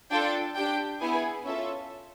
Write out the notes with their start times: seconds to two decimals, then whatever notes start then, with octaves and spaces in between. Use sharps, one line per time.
0.10 D4 F4 A4 G5
0.55 D4 G4 G5
1.00 B3 E4 G#4 G#5
1.45 C#4 F4 A4 E5